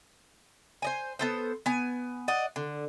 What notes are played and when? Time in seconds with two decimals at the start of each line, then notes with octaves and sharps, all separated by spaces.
0.82 C5 D#5 G#5
1.19 B3 A4 C5
1.66 B3 G#5
2.28 D5 D#5 F#5
2.56 D3